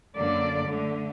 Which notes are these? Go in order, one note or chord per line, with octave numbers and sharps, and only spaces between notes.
F#2 D3 A#3 A4 D5
D3 A3